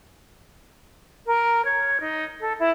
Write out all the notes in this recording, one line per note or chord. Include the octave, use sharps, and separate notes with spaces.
A#4
C#5
D#4
A4
E4